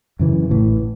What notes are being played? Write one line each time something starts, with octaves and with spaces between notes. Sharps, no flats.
F#2 C#3 E3
A1 A2 E3